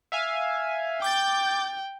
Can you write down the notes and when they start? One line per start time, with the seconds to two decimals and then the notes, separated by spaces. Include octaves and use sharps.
0.12 E5 F5 G#5
1.02 G5 D6 G6 A6